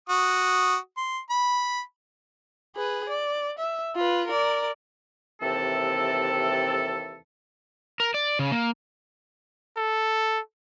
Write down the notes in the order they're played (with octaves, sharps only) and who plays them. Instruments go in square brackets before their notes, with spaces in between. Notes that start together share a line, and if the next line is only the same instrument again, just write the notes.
[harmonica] F#4 D#6
C6
B5
[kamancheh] G#4 B4
D5
E5
F4 B4
A#4 D5
[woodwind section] D#2 C3 E3 C4 A4
[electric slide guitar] A#4
D5
C#3
A#3
[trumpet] A4